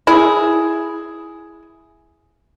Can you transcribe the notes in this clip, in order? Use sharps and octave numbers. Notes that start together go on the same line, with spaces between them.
E4 G#4